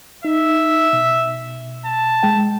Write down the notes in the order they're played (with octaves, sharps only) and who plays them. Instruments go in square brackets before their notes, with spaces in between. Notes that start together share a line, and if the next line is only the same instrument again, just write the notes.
[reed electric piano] D#4 [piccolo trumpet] E5
[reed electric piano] B2
[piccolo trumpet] A5
[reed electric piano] G#3 G5